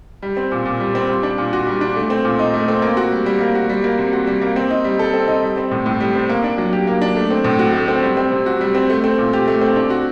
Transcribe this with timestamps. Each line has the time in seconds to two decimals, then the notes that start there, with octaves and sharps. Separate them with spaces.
0.22 G3
0.37 C4
0.52 A#2
0.65 A#2
0.80 G3
0.95 C4
1.09 G3
1.23 D4
1.38 A#2
1.53 F#4
1.67 G3
1.81 D4
1.96 A3
2.10 C4
2.25 A#2
2.39 D#4
2.54 A3
2.68 C4
2.82 A#3
2.97 F#4
3.11 G3
3.26 G3
3.40 A#3
3.55 F#4
3.69 G3
3.84 A#3
3.99 C3
4.13 F#4
4.27 G3
4.42 A#3
4.56 C4
4.71 D#4
4.84 G3
4.99 A4
5.14 C4
5.28 D#4
5.43 G3
5.57 C4
5.71 A2
5.86 A2
6.00 G3
6.15 C4
6.29 A#3
6.44 D4
6.58 F#3
6.73 G4
6.87 A#3
7.01 D4
7.16 A3
7.31 C4
7.44 A2
7.59 F#4
7.73 A3
7.88 C4
8.02 G3
8.17 C4
8.32 C3
8.46 F#4
8.61 G3
8.75 C4
8.90 A3
9.04 C4
9.18 A#2
9.33 G4
9.48 A3
9.61 C4
9.76 D4
9.90 F#4